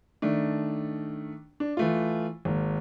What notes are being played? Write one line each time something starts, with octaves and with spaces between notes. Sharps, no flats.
D#3 A3 D4
D4
E3 A3 F4
G#1 A#3